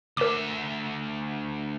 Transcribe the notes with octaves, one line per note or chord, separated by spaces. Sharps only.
D2 A#4 E5 D6